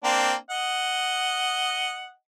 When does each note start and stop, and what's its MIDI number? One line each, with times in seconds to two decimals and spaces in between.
0.04 0.34 58
0.04 0.34 60
0.04 0.34 62
0.50 2.12 75
0.50 2.12 78